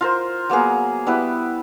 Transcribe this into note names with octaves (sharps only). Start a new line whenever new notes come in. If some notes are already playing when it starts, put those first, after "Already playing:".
F4 A#4 C5
F#3 A#3 B3 G#4
G3 B3 E4 B4